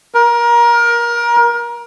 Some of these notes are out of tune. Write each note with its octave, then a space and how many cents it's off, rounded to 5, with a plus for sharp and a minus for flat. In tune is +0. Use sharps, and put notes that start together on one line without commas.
A#4 +25